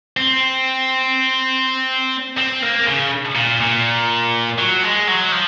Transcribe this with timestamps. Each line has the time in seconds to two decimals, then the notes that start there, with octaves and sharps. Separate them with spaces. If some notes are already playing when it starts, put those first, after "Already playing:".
0.17 C4
2.38 C4
2.62 A#3
2.87 C#3
3.35 A#2
3.61 A#2
4.58 F#3
4.83 G#3
5.07 F#3
5.32 F3